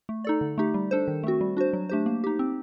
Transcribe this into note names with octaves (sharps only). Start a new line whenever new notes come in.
A3
D#4 A4 D5
D3
A3 D#4 G4
G3
D4 A4 C5
D#3
A3 C4 F#4
G3
D4 F#4 C5
F#3
A3 D4 G4 C5
A#3
D#4 G4
C4